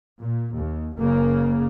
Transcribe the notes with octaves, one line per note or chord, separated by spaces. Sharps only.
A#2
D#2
F#1 C#3 A#3